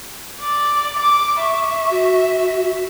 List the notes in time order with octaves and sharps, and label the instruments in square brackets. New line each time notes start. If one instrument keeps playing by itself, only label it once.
[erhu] D5
D6
[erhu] E5 [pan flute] C#6
[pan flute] F#4